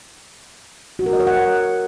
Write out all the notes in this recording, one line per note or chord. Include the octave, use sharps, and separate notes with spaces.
F#4
A#4
D#5
C#5
F#5